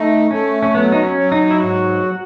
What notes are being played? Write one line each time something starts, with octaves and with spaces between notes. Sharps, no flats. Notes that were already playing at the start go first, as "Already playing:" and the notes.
Already playing: A3 D#4
A3 C#4
C#4
F#3 B3
D#4
C#4
F#3
D#4
E4
G#2 F#4